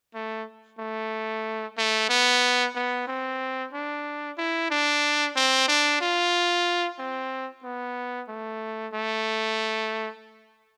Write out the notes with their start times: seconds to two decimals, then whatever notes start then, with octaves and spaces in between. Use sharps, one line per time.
0.14 A3
0.79 A3
1.78 A3
2.09 B3
2.75 B3
3.07 C4
3.73 D4
4.38 E4
4.70 D4
5.36 C4
5.68 D4
6.01 F4
6.99 C4
7.64 B3
8.29 A3
8.94 A3